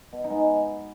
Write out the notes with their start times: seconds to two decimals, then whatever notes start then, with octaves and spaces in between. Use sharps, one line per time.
0.13 B2
0.24 D#4
0.30 G#3 B3